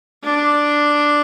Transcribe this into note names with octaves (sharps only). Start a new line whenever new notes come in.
D4